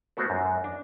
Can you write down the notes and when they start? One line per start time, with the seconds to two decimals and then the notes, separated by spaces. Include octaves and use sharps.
0.17 A3 B3 F#4 A#4 C5
0.30 F#2
0.64 D4